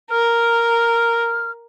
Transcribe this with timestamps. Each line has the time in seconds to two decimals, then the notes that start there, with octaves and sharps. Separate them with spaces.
0.11 A#4 F6